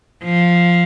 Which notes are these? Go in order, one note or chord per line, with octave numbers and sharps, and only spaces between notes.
F3